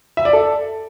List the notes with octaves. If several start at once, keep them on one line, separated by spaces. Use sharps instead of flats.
E5
D5
A4